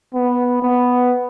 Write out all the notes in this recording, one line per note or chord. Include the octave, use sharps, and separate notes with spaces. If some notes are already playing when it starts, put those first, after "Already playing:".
B3
B3